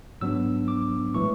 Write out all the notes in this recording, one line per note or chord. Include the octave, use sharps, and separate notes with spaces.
G#2 F#3 B3 D4 E6
D6
A2 E3 G#3 C#6